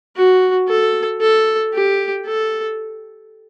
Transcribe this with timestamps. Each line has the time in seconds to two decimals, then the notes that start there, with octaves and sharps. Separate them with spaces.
0.16 F#4
0.68 A4
1.21 A4
1.73 G4
2.26 A4